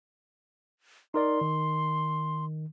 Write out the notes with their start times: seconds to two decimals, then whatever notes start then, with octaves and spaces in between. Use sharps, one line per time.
1.14 D#4 A#4 D5 C6
1.41 D#3